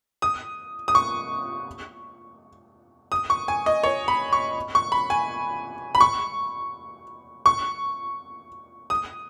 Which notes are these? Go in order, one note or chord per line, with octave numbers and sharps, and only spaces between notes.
D#6
D#6
C#6
D#6
C#6
G#5
D#5
C#5
B5
C#6
C#6
B5
G#5
B5
C#6
C#6
D#6